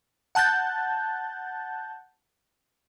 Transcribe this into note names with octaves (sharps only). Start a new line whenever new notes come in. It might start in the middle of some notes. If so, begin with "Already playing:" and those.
F#5 A5 F#6 G6 A6